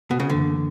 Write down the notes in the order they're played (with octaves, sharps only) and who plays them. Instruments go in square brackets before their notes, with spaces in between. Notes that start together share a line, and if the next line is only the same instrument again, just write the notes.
[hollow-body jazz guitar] B2
C#3
[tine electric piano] F#2 E3 A#3 [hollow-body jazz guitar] D3